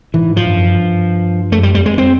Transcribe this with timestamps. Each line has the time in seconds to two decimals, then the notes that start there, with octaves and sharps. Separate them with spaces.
0.14 G#2 E3
0.36 G#2 F3
0.46 G2
0.56 F#2
0.66 G2
1.52 F#2 A3
1.63 G3
1.75 F2 G3
1.86 G#3
1.98 C4